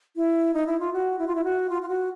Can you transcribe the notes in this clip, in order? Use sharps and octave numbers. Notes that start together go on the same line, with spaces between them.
E4
D#4
E4
F4
F#4
E4
F4
E4
F#4
F4
F4
F#4